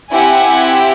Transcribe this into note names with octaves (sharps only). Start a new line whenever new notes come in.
C4 E4 G4 F#5 G#5